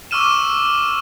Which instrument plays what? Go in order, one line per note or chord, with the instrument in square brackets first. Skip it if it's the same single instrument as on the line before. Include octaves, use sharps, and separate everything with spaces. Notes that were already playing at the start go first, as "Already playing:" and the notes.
[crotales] C#6 D6 E6 F6 D#7 E7